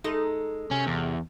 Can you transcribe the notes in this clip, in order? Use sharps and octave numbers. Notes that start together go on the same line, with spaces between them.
G#3 D#4 A4
C3 C#4
E2